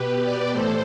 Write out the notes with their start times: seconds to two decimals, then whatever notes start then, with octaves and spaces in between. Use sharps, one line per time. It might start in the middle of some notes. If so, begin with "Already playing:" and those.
Already playing: B2 G4 B4
0.22 B4 D5
0.52 A2 E3 A4 C5